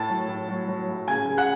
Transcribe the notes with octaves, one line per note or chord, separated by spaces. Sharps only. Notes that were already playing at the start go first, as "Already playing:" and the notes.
Already playing: A2 A5 A6
F#3
A2
F#3
F#3
A2
C#3 G#5 G#6
C#3
F#5 F#6